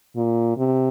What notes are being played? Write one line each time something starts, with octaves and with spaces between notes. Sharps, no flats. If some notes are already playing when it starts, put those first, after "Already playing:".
A#2
C3